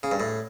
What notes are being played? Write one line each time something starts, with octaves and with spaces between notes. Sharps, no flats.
C#3
G2
A2